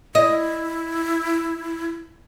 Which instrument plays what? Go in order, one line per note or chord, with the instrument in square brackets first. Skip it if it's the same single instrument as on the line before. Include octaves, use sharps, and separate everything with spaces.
[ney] E4 [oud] D#5